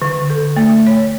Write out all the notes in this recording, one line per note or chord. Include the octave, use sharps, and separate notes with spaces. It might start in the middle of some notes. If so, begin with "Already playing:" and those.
D3
A4
A3
C#5